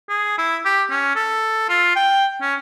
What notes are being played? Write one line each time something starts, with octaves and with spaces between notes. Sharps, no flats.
G#4
E4
G4
C#4
A4
F4
G5
C#4